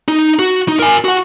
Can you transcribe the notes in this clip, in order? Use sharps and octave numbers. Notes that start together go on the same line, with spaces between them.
D#4
F#4
D#4
A#4 G#5
F#4 F#5